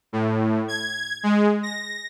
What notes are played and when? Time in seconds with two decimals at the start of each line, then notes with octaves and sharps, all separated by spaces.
0.13 A2
0.68 G#6
1.23 G#3
1.63 A#6